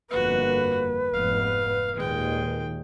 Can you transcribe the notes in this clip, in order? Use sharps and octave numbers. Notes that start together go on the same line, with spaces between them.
G1 F2 A#3 F#4 B4
F1 G#2 B3 F5
D#2 A#2 D#3 G#3 G5